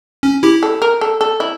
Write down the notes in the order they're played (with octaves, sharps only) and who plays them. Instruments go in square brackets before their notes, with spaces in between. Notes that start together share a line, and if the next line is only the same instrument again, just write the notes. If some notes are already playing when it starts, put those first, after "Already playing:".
[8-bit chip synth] C#4
E4 G4
[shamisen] A4
A#4
A4
A4
E4